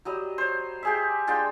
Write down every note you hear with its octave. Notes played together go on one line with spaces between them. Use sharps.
F#3 G3 D#5
C5 C#5
G4 G#4 E5
G#3 D4 F4 G5